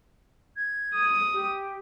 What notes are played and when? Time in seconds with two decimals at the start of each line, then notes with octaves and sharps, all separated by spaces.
0.56 G#6
0.94 D#6
1.32 G4